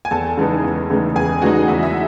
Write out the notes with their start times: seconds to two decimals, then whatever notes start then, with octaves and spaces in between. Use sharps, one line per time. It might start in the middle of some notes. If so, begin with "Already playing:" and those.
0.05 G#5
0.11 E2 A4 A5
0.37 C#3 E3 G#3 D#4
0.63 E2
0.90 C#3 E3 G#3 D#4
1.16 E2 G#4 G#5
1.42 C#3 E3 G#3 D#4 F#4 F#5
1.68 E2 E4 E5
1.83 E5